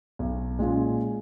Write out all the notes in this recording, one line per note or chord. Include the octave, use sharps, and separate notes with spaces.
B1
A#2 G#3 C#4 F4